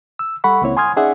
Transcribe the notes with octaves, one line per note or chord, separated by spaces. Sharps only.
E6
G3 A4 F#5 B5 C#6
C#2 C#3 A#3 C4 E4 C#5
G#5 C6 D#6 F6 G#6
C#4 D#4 G#4 D5 E5 F#5